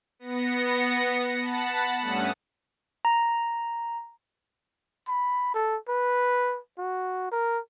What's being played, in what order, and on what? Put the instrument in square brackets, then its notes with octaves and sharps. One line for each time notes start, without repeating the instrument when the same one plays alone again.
[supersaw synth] B3 A#6 C#7
F#5 A5 B5
G2 A3 C#4 F#5 D#6
[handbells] A#5
[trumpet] B5
A4
B4
F#4
A#4